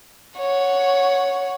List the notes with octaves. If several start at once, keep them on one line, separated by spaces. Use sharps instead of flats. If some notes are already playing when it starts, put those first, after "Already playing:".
C#5 F#5